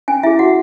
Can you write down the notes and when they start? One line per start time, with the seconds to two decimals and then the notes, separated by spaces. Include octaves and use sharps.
0.08 C#4 G#5
0.23 E4 G#4 E5
0.39 F#4 F#5